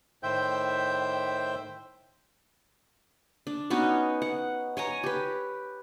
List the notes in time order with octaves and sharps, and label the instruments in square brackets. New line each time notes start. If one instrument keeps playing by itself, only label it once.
[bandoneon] A2 D#3 C5 E5 G5 G6
[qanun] D4
B3 C#4 D#4 F#4
F#5
C#5 G#5 A#5
G4 B4